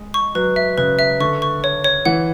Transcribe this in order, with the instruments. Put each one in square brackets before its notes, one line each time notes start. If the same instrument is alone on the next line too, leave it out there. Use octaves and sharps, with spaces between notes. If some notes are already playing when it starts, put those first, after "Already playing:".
Already playing: [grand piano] G#3
[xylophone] C#6
[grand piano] F#3 [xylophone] B4
[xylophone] E5
[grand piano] C#3 [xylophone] B4
[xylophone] E5
[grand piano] D3 [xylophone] C#6
[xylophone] C#6
C#5
C#5
[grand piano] E3 [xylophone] F#5